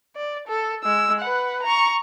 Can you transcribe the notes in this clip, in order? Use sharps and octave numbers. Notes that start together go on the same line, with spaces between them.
D5
A4
G#3 E6
B4 F#5
A#5 C#6